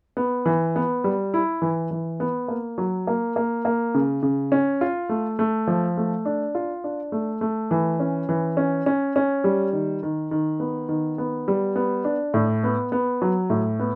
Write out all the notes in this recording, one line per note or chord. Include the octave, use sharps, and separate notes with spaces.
B3
E3
B3
G3
E4
E3
E3
B3
A#3
F#3
A#3
A#3
A#3
C#3
C#3
C#4
F4
A3
A3
F3
A3
D4
F4
D4
A3
A3
E3
C#4
E3
C#4
C#4
C#4
G3
D#3
D#3
D#3
B3
D#3
B3
G3
B3
D4
A2
B3
B3
F#3
A2
B3